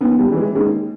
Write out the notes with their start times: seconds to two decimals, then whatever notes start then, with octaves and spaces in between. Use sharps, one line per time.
0.01 D#2 B3
0.19 G3
0.28 C#3 E3
0.37 G#3
0.55 D#2 G#3